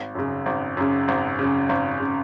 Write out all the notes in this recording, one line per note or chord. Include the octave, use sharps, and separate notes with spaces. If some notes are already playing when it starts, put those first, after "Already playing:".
Already playing: G#1
F#2 C#3
G#1
F#2 C#3
G#1
F#2 C#3
G#1
C#3